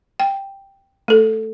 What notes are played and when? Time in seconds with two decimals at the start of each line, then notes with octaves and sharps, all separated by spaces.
0.20 G5
1.08 A3 A4